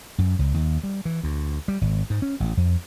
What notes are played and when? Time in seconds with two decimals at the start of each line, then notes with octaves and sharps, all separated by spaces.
0.18 F#2
0.39 C#2
0.54 D#2
0.84 G3
1.05 E3
1.24 D2
1.68 G3
1.81 G#1
2.10 G#2
2.22 C#4
2.40 A1
2.57 F2